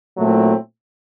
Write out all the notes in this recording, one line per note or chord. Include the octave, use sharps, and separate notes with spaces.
A#2 F#3 A3 C4 E4